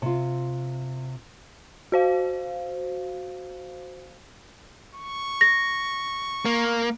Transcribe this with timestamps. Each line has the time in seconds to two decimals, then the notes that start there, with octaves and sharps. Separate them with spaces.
0.02 C3 F4
1.92 F#4 C5 F5
4.95 C#6
5.41 A#6
6.45 A#3